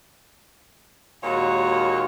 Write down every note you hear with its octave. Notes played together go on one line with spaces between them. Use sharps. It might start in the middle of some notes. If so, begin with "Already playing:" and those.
D#2 A#2 G#3 F#4 C#5